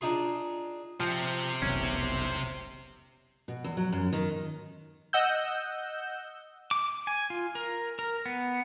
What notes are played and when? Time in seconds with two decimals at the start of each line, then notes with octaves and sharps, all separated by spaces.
0.01 D4 D#4 F4 G#4 C6
1.00 C3 F3 C4
1.62 F1 B1 E2 C#4
3.48 B2
3.64 E2
3.77 F#3
3.92 F#2
4.13 D#3
5.13 D#5 F#5 E6 G6
6.71 D6
7.07 G#5
7.30 F4
7.55 A#4
7.99 A#4
8.26 B3